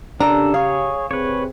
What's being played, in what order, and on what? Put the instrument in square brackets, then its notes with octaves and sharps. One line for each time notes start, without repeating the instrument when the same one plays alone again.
[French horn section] C#3 G4 [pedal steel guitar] D4 A4 [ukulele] A#4 D5 [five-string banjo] A#5
[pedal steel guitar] G#4 C#5 [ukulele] F5
[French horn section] C3 C4 G#4 [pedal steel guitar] B4 C#5